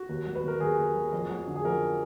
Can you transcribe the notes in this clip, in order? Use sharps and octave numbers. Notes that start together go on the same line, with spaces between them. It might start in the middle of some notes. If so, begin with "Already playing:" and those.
Already playing: F#4
D#2
F#3
B4
D#3 A#4
D#2 G#4
D#2
F#3
F2
F#3
D3
G#4
F2 A#4